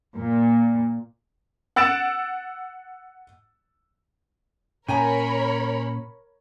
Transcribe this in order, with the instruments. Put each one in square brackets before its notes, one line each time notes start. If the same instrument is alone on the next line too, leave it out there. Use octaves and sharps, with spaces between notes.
[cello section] A#2
[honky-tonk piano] F#5 E6 A6 D7 E7
[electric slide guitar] A#2 C#4 [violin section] A#4 C#5 B5 [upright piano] G5 G#5 A#5